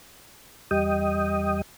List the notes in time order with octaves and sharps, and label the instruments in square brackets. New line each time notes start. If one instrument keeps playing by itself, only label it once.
[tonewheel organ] E2 G3 D#5 G5 D#6